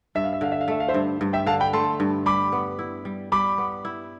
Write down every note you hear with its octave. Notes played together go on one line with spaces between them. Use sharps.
G2 E5
F5
E5
D3 F5
E5
F5
A3 E5
F5
C5 E5
G2
G2
E5 G5
D3 F5 A5
G5 B5
A3 A5 C6
G2
G3 B5 D6
B3
E4
G3
G3 B5 D6
B3
E4